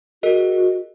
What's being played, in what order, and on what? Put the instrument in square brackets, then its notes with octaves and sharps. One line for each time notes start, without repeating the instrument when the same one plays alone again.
[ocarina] F#4 [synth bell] G#4 A#4 D#5